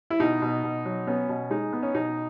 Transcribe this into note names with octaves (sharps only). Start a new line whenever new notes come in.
E4
B2 D#4
B2
B2
F#3
B3 C#4
B2
G#3 D#4
B3
C#4
B2 D#4